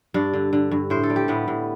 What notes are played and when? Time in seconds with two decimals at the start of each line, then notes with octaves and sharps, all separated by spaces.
0.14 G2 D4
0.33 D3
0.53 D3
0.71 G2
0.90 A2 C5
1.03 A4
1.10 G3
1.16 G4
1.28 A2 B3
1.48 A2